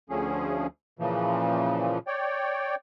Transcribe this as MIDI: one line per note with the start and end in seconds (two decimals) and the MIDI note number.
0.10 0.67 38
0.10 0.67 50
0.10 0.67 53
0.10 0.67 61
0.10 0.67 68
0.99 1.98 46
0.99 1.98 49
0.99 1.98 52
0.99 1.98 53
2.07 2.75 73
2.07 2.75 74
2.07 2.75 79